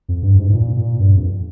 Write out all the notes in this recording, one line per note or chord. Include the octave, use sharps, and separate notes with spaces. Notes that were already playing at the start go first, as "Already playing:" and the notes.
F2
G2
G#2
G#2
A#2
A#2
G2
F2